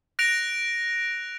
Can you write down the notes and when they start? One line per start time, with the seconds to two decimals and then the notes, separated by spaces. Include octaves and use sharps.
0.19 F#6 A#6 D7 F7